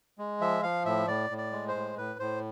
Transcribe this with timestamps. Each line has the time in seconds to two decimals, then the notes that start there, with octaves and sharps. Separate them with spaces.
0.19 G#3
0.41 F3 E5
0.63 F3 F5
0.85 A2 E5
1.08 A2 D5
1.30 A2
1.38 D5
1.52 G#3
1.68 C5
1.75 A2
1.97 A2 B4
2.19 A2 C5